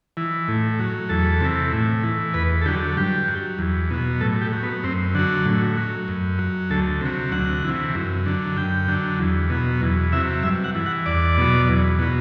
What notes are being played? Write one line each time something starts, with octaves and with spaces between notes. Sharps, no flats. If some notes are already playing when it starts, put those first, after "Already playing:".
E3
A2
F#3
E2 A4
C3 E3
A2
E3
E2 B4
A4
D3 F#3 G4
G2 G4
F#3
E2
B2 F#3
A2 A4
G4
F#3
B3
F#2 C4
D3 F#3 F#4
A2
F#3
F#2
F#3
D2 A4
C3 F#3
D2 F#5
C3 E3
F#2
D3 F#3
F#2 G5
D3 F#3
E2
B2 F#3
E2
C3 F#3 E5
G2 E5
F#5
E3
F#5
E2 D5
B2 F#3
E2
B2 F#3